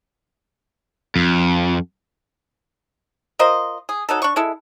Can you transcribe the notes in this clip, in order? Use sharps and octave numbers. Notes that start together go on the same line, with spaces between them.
F2
F4 A#4 C5 D#5
G#4
F#3 D#4 A4
D4 C#6
G#3 E4 A4